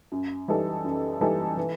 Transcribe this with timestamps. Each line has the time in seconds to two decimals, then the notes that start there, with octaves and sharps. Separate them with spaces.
0.12 F#2
0.48 E3 G3 D#4 A4
0.84 F#2
1.21 E3 G3 D#4 A4
1.57 E3